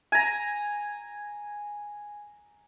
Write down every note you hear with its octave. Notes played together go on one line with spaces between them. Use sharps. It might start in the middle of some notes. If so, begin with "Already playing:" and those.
G#5 A#5